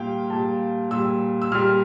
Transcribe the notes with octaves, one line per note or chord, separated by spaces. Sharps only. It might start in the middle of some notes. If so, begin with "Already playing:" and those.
Already playing: A#2 G3 F5 G5
A#2 G3 A5
A#2 G3 E6
E6
A#2 G3 F6